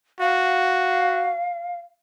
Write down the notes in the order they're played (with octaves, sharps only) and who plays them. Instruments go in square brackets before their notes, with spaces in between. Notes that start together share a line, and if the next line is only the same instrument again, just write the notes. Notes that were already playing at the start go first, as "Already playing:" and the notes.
[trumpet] F#4 [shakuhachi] F5